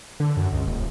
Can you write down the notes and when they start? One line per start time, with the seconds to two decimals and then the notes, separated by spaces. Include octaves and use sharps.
0.20 D3
0.37 F#2
0.53 C#2
0.67 D#1